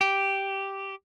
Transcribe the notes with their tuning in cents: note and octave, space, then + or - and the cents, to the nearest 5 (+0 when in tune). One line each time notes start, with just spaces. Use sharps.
G4 -5